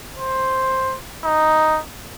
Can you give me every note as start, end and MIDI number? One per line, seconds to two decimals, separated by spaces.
0.18 0.96 72
1.24 1.79 63